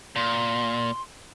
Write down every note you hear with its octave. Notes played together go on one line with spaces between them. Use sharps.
A#2 C6